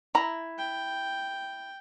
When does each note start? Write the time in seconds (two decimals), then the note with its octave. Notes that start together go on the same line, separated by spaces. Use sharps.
0.15 E4 A#5
0.59 G5